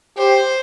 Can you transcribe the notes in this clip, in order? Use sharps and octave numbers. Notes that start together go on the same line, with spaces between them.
G4 C5